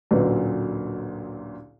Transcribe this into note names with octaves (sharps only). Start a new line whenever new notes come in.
A1 D2 A#2 F#3